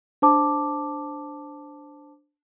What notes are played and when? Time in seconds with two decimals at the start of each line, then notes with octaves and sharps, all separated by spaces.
0.22 D4 C5 A5 D6